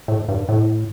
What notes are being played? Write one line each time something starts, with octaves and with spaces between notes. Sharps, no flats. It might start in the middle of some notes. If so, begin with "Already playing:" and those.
A2
G2
A2